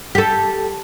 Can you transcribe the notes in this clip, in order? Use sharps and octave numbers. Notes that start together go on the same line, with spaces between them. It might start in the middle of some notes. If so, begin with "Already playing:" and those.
G4 A4